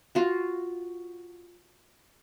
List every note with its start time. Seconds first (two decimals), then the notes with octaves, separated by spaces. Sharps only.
0.15 F4 F#4